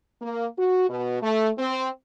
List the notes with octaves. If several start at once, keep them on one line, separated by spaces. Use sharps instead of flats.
A#3
F#4
B2
A3
C4